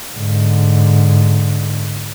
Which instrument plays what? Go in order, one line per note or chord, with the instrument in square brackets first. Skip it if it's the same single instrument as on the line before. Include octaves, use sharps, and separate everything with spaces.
[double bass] G#2 D3